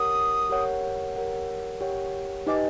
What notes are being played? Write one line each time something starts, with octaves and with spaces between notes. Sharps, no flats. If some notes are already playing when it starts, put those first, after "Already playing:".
Already playing: G4 A#4 C#5 F#5 D#6
G4 A#4 C#5 F#5
G4 A#4 C#5 F#5
G4 A#4 C#5 F#5
D#4 G4 B4 D#5 G#5 D6